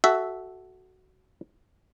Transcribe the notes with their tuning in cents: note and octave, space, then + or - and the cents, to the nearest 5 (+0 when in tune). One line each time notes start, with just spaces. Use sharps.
F#4 +10 A4 -15 E5 +0